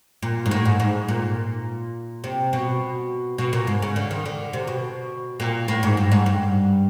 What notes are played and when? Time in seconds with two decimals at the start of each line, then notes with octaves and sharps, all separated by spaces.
0.22 A#2
0.46 G#2
0.51 A2
0.65 G#2
0.80 G#2
1.08 A#2
2.24 C3
2.53 B2
3.38 B2
3.53 A#2
3.67 G#2
3.82 C#3
3.96 D3
4.11 D#3
4.26 D3
4.53 C3
4.67 B2
5.40 A#2
5.68 A2
5.83 G#2
5.97 G2
6.11 G#2
6.26 G2